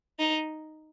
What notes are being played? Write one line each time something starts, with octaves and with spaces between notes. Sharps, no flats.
D#4